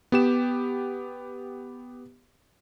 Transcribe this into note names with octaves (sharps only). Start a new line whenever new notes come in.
B3 G4 E7